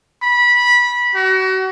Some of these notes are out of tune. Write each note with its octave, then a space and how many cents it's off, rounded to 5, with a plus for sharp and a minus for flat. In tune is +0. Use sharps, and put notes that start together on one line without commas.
B5 -20
F#4 +35